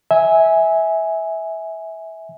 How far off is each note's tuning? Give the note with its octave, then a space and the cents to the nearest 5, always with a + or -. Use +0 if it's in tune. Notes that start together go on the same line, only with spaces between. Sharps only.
E5 -20 G#5 +0